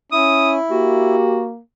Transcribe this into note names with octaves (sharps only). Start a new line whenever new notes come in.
C#4 E4 D#6
A#3 F#4 G4